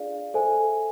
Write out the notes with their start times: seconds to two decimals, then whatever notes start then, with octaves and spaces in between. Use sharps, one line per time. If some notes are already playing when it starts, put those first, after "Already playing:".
Already playing: D4 F4 G#4 D5 F5
0.34 A4 C5 E5 G#5